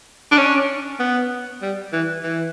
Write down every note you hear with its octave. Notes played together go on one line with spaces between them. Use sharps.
D4
C#4
B3
G3
E3
E3